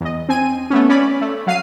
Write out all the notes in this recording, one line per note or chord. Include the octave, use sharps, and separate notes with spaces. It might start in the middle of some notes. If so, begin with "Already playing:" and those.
E2 D#5
C4 G#5 D#7
A3 B3 C#4
C#4 D5 B5
A3
F#3 F5 C7 D#7